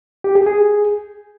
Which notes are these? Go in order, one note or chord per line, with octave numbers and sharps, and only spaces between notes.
G4
G#4
G#4